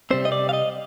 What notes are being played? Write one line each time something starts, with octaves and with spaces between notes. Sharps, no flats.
C3 G3 C4 C5
D#5
D5
F5
D#5